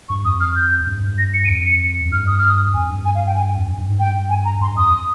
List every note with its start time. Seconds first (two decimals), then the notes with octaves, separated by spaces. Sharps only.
0.09 G2 C#6
0.25 F2 D#6
0.41 F6
0.56 G6
0.87 G2
1.03 G2
1.18 A#6
1.34 C#7
1.45 D#7
1.49 F2 C#7
1.65 C#7
2.05 F2
2.11 G2 F6
2.27 D#6
2.38 F6
2.50 D#6
2.74 F2 G#5
2.90 G2
3.05 G#5
3.15 F5
3.26 G5
3.36 G#5
3.57 F2
3.67 G2
3.78 G2
3.88 G#2
3.98 G2 G5
4.30 G#5
4.45 A#5
4.61 G2 C6
4.77 F2 D#6